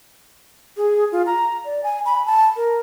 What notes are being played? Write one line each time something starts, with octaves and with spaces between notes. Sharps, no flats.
G#4
F4
A#5
D5
G#5
B5
A5
A#4